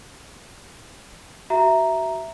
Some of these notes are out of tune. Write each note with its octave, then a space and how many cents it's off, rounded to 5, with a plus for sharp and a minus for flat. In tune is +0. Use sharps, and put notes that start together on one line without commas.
F#4 +25 E5 +0 A#5 +0